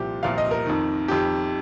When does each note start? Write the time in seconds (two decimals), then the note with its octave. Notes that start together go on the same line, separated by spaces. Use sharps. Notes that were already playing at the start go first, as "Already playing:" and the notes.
Already playing: C2 A#2 F3 G4
0.23 C2 A#2 F3 F5
0.38 D#5
0.51 A#4
0.66 F2 D#3
1.08 F2 D#3 G4